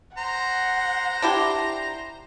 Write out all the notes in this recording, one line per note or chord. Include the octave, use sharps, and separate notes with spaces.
C5 F#5 A#5
D4 E4 G4